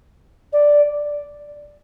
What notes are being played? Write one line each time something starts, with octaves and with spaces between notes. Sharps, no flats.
D5